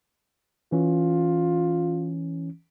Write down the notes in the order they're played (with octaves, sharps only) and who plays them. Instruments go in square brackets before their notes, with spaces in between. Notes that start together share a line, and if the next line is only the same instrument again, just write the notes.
[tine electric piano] E3 C#4 [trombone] F4